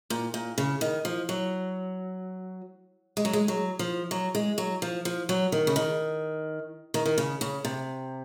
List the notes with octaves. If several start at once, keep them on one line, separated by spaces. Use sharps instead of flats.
A#2
A#2
C#3
D#3
F3
F#3
G#3
F#3
G#3
F#3
F3
F#3
G#3
F#3
F3
F3
F#3
D#3
C#3
D#3
D#3
D#3
C#3
C#3
C3